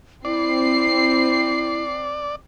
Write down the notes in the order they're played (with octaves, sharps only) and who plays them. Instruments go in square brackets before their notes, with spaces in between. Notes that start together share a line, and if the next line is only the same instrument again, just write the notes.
[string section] C4 C7 [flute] E4 [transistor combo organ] D5